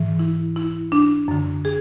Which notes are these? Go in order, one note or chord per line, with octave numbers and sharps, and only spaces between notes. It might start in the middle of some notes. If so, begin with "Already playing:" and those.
Already playing: G#2 E3
E4
E4
D4
F#2 D3
G#4